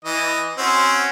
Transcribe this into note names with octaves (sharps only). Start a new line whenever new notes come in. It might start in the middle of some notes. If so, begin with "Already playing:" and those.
E3 D#5
C4 C#4 F#4